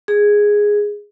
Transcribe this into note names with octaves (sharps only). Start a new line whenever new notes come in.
G#4